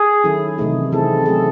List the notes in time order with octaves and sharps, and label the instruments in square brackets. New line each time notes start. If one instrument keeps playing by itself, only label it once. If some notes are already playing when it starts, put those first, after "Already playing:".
Already playing: [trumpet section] G#4
[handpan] D#3 F#3 C#4 E4 A4
C3 E3 A3 D#4 G#4
[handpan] C3 E3 C4 E4 G#4 [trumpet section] A4
[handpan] F#3 A3 C#4 G#4